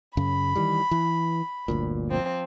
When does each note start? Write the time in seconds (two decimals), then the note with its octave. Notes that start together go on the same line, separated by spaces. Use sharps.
0.17 F#2 C#3 B5
0.56 D#3 E3 G3
0.91 E3
1.68 G1 D2 A#2
2.09 F3 C4